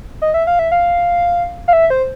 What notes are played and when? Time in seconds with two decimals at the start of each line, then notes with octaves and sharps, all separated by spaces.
0.22 D#5
0.34 E5
0.47 F5
0.59 E5
0.72 F5
1.68 F5
1.73 E5
1.90 C5